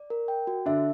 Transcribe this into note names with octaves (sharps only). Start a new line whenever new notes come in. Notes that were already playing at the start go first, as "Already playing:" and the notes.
Already playing: D5
A#4
G5
F#4
D3 D4 E5